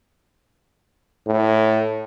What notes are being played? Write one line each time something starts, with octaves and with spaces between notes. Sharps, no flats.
A2